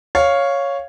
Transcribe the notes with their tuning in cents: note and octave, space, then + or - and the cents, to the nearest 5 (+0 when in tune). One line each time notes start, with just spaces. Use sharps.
C#5 +0 F5 +0